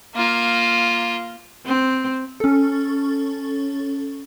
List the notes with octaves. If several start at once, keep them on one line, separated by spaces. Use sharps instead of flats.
A#3 F4
C4
C#4 A4